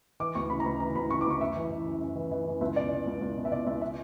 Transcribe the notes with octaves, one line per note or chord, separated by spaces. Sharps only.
E3 D6
D2 C#6
C#3 B5
A#5
D2 B5
E3 A#5
D2 B5
C#3 C#6
D6
D2 C#6
F#2 E5
E3
E3
F#2
F#2
E3
E3
F#2
C#2 E5
B2 D5
B2
C#2
C#2
B2
E5
B2 D5
C#2 E5
E5